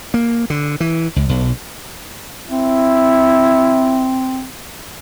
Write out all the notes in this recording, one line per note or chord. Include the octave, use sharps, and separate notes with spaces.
A#3
D3
E3
C#2
B1
C4 E4